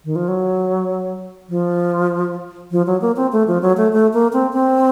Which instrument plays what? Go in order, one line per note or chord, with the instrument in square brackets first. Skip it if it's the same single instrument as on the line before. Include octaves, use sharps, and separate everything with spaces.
[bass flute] D#3
F3
F#3
F3
F3
F#3
A#3
C4
A3
F3
F#3
A3
A3
A#3
C4
C4